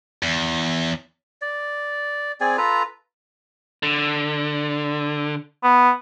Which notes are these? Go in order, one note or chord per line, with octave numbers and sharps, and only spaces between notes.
E2
D5
C4 G#4 D5 G#5
F4 A4 B4 A#5
D3
B3